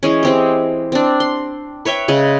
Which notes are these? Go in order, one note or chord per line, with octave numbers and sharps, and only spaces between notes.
E3 G#3 C#4
G#3 C4 G4
C4 D4
C6
B4 C#5 E5 G5
C#3 G#3